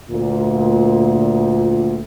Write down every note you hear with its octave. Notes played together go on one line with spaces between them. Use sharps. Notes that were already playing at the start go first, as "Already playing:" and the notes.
D2 A#2